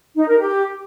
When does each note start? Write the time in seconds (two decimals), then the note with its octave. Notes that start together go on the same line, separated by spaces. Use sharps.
0.15 D#4
0.27 A#4
0.38 G4